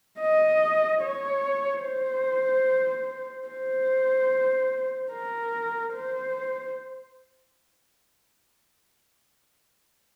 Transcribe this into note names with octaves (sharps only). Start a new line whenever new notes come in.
D#5
C#5
C5
C5
A#4
C5